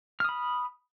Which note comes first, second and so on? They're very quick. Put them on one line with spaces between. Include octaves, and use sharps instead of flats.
F6 D#6 B5